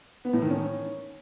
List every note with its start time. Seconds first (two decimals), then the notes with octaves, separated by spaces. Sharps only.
0.25 B3
0.33 A2
0.42 D#3
0.50 C#4